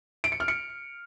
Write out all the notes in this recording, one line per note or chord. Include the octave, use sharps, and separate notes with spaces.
D7
C#7
F6
C#7